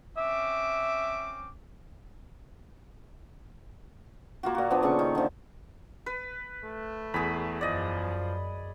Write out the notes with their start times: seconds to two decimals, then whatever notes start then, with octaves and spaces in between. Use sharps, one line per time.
0.17 C4 C#4 E5 D6
4.43 A#3 F4 F#4
4.55 A#2 F#4
4.70 F3 B3 D4
4.82 A#2 C#3 A4 C#6
4.99 D#3
5.15 D3 F3
6.06 B4
6.64 A3
7.14 E2 G#4 B5
7.61 F#2 F3 D5 D#5